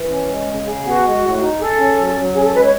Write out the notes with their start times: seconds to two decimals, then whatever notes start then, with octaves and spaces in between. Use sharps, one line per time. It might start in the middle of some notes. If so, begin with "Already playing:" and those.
Already playing: E3
0.10 C#4
0.28 G#3
0.47 C#3
0.66 G#4
0.85 B3 F#4
1.04 G#3
1.22 A2
1.41 D#4
1.60 G#4 A4
1.79 C#4
1.97 F#3
2.16 F#3
2.34 C#4 G#4
2.45 A4
2.54 G#3 B4
2.63 C#5